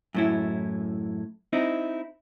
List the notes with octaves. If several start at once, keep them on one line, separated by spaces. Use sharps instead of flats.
F#2 A2 E4
C4 D#4 E4